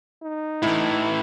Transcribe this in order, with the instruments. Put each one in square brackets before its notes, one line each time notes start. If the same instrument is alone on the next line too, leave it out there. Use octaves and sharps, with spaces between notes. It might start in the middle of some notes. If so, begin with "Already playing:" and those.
[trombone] D#4
[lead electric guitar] A2 E3 [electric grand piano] E4